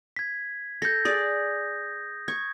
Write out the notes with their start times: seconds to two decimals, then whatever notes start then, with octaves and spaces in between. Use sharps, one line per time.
0.16 G#6 B6
0.82 A4 G6 A#6
1.05 G#4 D5 D#6
2.28 C#6 G#6